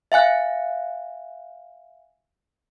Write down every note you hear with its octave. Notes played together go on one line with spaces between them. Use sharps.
E5 F5 G#5 F#6